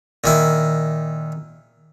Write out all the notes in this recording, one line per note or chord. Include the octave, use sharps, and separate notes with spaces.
A#2 D#3 E4